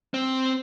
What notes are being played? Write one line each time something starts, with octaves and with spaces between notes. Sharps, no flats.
C4